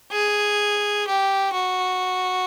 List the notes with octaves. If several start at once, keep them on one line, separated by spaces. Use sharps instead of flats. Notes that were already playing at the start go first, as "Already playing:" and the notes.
G#4
G4
F#4